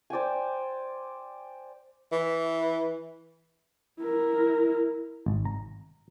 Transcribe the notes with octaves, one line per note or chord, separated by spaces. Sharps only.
C5 D5 G5 G#5
E3
E4 A#4
G#1
A#5